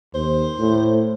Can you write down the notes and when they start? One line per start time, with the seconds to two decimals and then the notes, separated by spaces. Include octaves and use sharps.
0.14 D#2 C5
0.60 A2